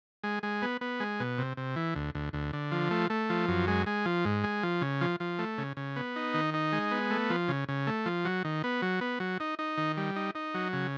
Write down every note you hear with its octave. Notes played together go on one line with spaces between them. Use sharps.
G#3
G#3
B3
B3
G#3
B2
C3
C3
E3
D2
D2
D2
D3
F3
A3
A3
F3
F#2
G#3
G#3
F3
G#2
G#3
F3
C#3
F3
F3
A3
C#3
C#3
B3
D#4
D#3
D#4
G#3
B3
A3
F3
C#3
C#3
A3
F3
F#3
D#3
B3
F#3
B3
F#3
D#4
D#4
D#3
G3
D#4
D#4
F#3
C#3